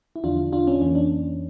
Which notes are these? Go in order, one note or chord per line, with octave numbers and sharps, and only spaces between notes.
E4
E2 D3 F3 D4 F4
D4 F4
C#4
D4
F2 E3 A#3 C#4
D4